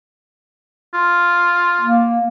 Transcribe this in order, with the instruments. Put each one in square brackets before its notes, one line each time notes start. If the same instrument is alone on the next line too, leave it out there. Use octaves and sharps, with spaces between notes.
[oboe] F4
[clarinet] A#3